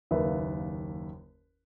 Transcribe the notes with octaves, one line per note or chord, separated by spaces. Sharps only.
F#1 D#2 A#3 B4 E5